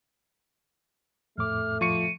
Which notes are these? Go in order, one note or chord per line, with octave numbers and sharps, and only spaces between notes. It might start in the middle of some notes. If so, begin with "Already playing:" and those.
F2 A2 A3 D6 F6
F3 C#6 C#7 D#7